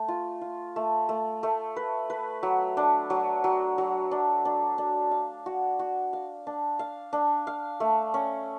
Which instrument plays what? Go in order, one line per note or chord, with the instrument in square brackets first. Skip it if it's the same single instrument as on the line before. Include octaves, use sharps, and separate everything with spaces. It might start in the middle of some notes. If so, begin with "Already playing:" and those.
Already playing: [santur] A3
F4
F4
A3
A3
A3
B4
B4
F#3
D4
F#3
F#3
F#3
D4
D4
D4
F5
F#4
F#4
F5
D4
F5
D4
F5
A3
C#4